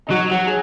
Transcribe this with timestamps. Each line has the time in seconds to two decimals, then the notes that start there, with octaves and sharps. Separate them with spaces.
0.07 D#4
0.11 F#3 F#4
0.31 F#3 F#4
0.47 G#4